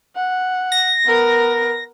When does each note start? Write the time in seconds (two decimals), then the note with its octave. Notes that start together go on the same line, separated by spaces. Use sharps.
0.16 F#5
0.72 A#6
1.05 B3 A#4